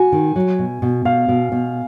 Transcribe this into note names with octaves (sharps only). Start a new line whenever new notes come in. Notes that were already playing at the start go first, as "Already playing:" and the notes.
Already playing: F#4 G#5
D#3
F#3
B2
B2
B2 F5
B2
B2